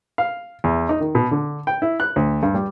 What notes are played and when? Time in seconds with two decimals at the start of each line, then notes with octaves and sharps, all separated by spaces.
0.18 F5
0.64 E2
0.89 D#4
1.01 D#3
1.15 B2
1.31 D3
1.67 G5
1.82 E4
2.00 F#6
2.16 D2
2.43 G2
2.54 G3